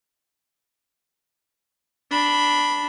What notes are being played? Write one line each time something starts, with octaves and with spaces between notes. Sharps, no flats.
D4 B5